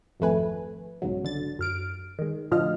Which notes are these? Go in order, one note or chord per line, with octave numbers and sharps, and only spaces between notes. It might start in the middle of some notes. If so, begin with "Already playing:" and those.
G#1 F2 A3 B4 G#5
B1 G#2 C#3 F#3
D3 A6
F#2 F6 D7
D#3 G#3
A2 D3 F3 F4 D#5 F6